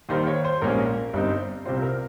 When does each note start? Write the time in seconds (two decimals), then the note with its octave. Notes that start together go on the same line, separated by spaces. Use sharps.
0.09 D#2 D#3 G3 C5
0.27 C#5
0.44 C5
0.61 A#1 G#2 G3 A#3 C#4 A#4
1.13 G1 G2 G3 C4 D#4
1.65 C2 C3 G3 C4 F4 C5
1.82 A#4